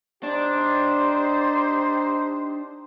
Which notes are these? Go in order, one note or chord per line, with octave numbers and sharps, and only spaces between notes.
D4 D#4 G4 C5